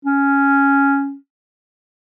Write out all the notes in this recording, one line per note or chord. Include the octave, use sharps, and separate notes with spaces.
C#4